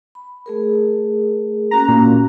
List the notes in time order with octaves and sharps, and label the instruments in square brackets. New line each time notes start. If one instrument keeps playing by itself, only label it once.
[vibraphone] B5
A3 G#4 A#4
[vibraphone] A#3 C#4 F#4 [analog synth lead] A#5
[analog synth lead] A#2